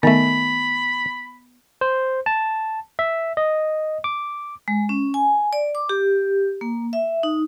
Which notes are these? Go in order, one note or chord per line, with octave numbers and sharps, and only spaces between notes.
D#3 A3 B3 B5
C5
A5
E5
D#5
D6
G#3
C#4
G#5
D5
D6
G4
A#3
E5
D#4